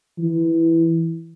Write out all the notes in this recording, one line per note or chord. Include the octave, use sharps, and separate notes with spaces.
E3